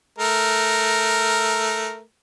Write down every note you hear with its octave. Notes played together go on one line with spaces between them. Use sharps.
A3 A#4